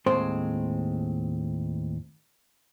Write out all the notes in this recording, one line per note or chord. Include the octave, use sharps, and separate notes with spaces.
D#2 A2 G#3 C4 C5 C6